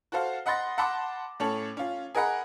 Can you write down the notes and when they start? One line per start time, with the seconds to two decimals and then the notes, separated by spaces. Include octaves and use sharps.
0.12 F#4 A4 C5 F5
0.46 D#5 F#5 B5 C6 A6 A#6
0.78 F#5 A5 B5 C6 D6
1.40 A2 C#4 A4 C#5 F#7
1.77 C#4 F4
2.15 G#4 A#4 D#5 F#5 B5